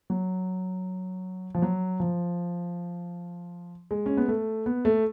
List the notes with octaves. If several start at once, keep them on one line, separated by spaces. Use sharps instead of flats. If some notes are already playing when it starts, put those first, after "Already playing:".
F#3
F3
F#3
F3
G#3
C#4
B3
A3
B3
A3